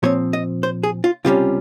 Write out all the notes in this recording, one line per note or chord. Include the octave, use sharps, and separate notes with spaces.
A#2 F3 C4 C#5
D#5
C5
G#4
F4
C#2 C3 G3 C#4 F4